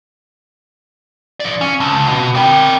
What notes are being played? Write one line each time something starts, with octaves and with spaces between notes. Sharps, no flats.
F3 D5
C#4 G#5
C#2 A5
B2
C4 A#4 G5 B5 D6